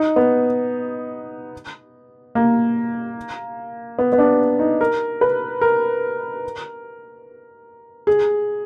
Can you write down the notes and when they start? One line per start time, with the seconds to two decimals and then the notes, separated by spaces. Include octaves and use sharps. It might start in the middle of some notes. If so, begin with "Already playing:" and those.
Already playing: D#4
0.16 B3
2.35 A#3
3.99 B3
4.13 B3
4.18 D4
4.59 D#4
4.81 A#4
5.21 B4
5.61 A#4
8.07 G#4